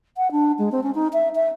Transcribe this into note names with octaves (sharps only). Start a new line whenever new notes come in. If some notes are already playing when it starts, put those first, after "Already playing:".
F#5
D4
G#3
C4
C#4
D#4
E5
E5